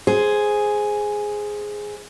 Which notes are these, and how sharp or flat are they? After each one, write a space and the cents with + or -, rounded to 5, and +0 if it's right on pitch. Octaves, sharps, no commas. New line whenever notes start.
G#4 +0 C5 +0